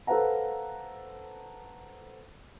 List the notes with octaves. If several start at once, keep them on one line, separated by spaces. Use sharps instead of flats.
A4 B4 C5 F5 F#5 A#5